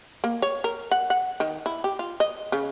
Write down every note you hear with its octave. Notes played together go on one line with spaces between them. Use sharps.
A#3
C#5
A#4
F#5
F#5
D#3
E4
G4
F4
D#5
C#3